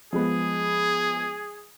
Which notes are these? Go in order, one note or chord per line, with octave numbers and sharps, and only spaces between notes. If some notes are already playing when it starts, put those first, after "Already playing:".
F3 G#3 B3 G#4